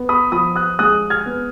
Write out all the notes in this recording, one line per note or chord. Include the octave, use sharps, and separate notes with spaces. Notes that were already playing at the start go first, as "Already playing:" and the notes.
Already playing: B3
B5 D#6
F3 B5 D#6
D#6 F#6
G#3 D#6 F#6
F6 G#6
B3